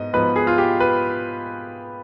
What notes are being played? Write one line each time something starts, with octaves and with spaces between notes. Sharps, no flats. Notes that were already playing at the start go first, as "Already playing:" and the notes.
Already playing: G#2 B3 D#5
G#2 F3 B3 B4
G#4
F4
G4
B4